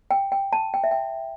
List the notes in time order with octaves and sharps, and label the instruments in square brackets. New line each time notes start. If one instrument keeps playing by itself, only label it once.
[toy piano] G5
G5
A5
G5
E5
G5